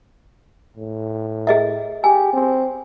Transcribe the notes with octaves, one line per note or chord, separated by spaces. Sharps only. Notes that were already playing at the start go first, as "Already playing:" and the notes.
A2
G#4 D#5 E5
G4 G#5
C4